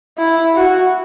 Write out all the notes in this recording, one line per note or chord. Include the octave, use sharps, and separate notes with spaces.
E4
F#4